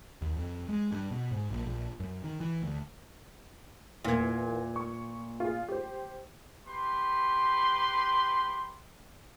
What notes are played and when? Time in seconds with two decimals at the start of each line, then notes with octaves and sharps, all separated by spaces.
0.22 D#2
0.36 F2
0.68 G#3
0.92 G2
1.11 B2
1.31 G#2
1.50 A#1
1.66 A#1
2.00 F#2
2.24 D#3
2.40 E3
2.63 D2
4.05 E2 A#2 A#3 G#6
4.76 C#6
5.40 F4 G#4
5.68 G4 C5
6.67 G4 B4 C6